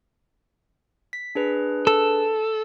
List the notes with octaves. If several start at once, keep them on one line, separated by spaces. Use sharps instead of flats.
B6
D4 G#4 B4
A4